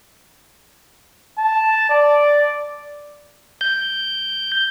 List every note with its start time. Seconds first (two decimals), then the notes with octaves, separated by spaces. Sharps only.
1.38 A5
1.90 D5
3.61 G6